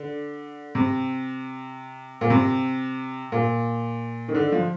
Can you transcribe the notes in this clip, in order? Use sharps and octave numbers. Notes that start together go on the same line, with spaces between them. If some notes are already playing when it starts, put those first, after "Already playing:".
Already playing: D3
C3
A#2
C3
A#2
D#3
D3
F3